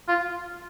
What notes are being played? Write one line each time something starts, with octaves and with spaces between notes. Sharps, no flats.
F4